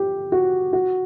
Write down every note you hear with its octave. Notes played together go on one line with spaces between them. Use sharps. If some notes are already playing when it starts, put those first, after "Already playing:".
Already playing: G4
F#4
F#4